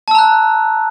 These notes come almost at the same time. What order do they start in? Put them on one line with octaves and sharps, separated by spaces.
A5 E6 A#5 F#6